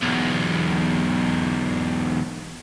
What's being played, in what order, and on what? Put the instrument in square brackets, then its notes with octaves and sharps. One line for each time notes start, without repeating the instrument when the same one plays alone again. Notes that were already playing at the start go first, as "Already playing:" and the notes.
[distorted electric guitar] B1 E2